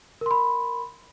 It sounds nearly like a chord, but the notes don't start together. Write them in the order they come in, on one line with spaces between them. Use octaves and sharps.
A#4 C6 B5